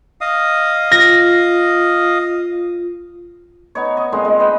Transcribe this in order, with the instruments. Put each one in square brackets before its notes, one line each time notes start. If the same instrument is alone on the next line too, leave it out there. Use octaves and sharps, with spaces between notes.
[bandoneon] D#5 F5 D#6
[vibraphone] F4 [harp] A#6
[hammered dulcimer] B3 D#4 C#5
D#5 C#6
A#2 G#3 C4
G#3
B4 D#5 G5